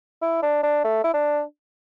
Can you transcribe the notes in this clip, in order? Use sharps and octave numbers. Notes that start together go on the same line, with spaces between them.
E4
D4
D4
A3
E4
D4